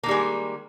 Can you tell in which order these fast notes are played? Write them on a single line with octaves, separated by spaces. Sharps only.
A#3 D#3 G3 G#3